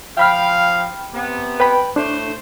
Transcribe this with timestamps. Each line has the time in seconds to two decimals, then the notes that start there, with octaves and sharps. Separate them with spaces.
0.17 F3 F5 G5 B5 F6
1.13 C3 B3
1.60 B4 G5 B5
1.96 A2 A3 D4 C5